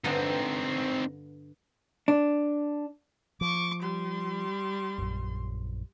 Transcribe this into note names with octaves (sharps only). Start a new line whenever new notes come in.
G2 D3 B3 C4 D#4
D4
F3 C#6 D6
G3 C6
A#1 F#2